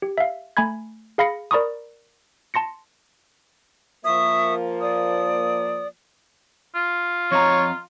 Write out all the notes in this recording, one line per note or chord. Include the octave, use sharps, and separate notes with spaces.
G4
E5 F5
A3 G#5 A#5 B5 G#6
G#4 F5 B5 A#6 C#7
A#4 D5 A#5 B5 C#6 D#6
A5 C6 A#6 C#7
F3 A#3 E5 C#6 D#6
D5 D#6
F4
F2 C#5 D#5 A#5